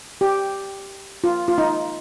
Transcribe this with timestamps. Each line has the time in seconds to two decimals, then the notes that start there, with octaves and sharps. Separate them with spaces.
0.21 G4
1.24 F4
1.48 F4
1.58 D#4